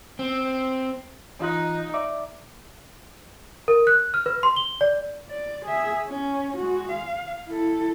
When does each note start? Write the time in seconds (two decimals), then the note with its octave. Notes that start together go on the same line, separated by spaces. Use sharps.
0.19 C4
1.40 E3 D#4 F4 F#6
1.94 D5 E5 D6
3.68 A#4
3.87 F#6
4.14 F6
4.26 B4
4.43 C6
4.56 G7
4.81 D5
5.27 D5
5.65 G#4 E5
6.07 C#4
6.56 G#3 F#4
6.90 F5
7.49 E4 A4